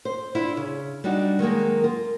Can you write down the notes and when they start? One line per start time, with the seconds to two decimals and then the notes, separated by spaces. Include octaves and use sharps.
0.05 C5
0.35 D4 E4 F4
0.57 C#3
1.04 G3 D4 D#4 F#4
1.39 D#3 F#3 G#3 A#3
1.84 F4 A#4